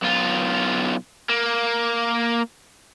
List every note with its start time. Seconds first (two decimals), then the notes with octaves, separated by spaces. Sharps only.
0.02 B1 F4
1.29 A#3